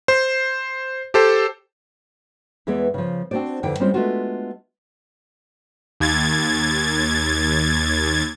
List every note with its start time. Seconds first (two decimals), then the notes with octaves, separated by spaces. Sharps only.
0.08 C5
1.14 G4 A4 C5
2.67 E2 E3 G#3 B3 E4 D5
2.94 C#3 F3
3.31 C4 D4 D#4 F#4 C5 D5
3.63 F2 D3 E3 G5
3.80 G3 G#3 C4 C#4 F4 C5
3.94 G#3 A3 B3 D4 F4 F#4
6.00 D#2 G#6 A6